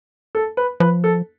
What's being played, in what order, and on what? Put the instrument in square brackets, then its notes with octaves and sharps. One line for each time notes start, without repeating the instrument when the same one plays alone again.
[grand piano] A4
B4
[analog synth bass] F3 [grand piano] B4
[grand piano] A4